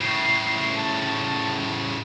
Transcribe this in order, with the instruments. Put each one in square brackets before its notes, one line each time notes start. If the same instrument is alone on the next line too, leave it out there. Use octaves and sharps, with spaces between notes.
[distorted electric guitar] A2 C#3 [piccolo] C7
[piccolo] A5